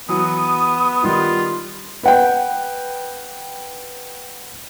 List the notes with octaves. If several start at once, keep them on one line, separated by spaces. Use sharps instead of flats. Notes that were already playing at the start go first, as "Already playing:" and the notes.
E3 F#3 B3 D#6
D#3 G3 F4
B4 F#5 G5